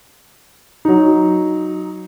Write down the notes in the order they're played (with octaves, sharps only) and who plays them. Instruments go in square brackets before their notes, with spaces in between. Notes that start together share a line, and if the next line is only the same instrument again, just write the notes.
[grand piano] F#3 D#4